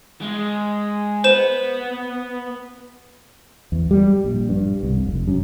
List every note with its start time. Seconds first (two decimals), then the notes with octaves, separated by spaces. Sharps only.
0.22 G#3
1.24 B3 B4 C5 E7
3.72 E2
3.91 G3
4.24 A#1
4.49 G2
4.83 C2
5.07 F1
5.28 F#2